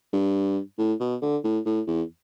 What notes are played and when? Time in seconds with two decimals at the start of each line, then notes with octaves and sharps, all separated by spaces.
0.13 G2
0.78 A2
1.00 B2
1.22 D3
1.44 A2
1.66 A2
1.87 E2